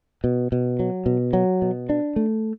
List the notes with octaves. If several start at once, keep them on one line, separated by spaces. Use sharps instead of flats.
B2
B2
F#3
B2
F#3
B2
D4
A3